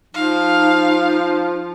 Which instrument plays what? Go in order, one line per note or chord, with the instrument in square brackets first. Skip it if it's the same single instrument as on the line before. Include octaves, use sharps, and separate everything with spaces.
[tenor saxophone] F3 [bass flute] D#4 [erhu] F5